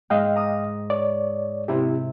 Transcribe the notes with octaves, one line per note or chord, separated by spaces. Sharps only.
G#2 D#5 F5 G5
A#5 D6 D#6
C#5 D5
C3 C4 E4 G4